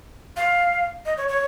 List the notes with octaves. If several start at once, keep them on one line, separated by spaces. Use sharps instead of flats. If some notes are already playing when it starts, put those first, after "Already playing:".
F5
D#5
C#5
C#5